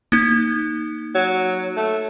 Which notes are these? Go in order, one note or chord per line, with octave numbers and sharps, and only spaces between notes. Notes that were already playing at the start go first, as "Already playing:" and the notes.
A#3 D#4
F#3
A3